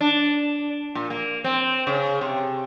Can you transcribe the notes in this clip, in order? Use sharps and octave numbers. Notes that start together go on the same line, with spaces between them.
D4
A#2
A#3
C4
C#3
C3